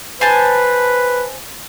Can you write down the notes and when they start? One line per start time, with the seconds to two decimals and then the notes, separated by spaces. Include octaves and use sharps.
0.21 B4 C5 G#5 A5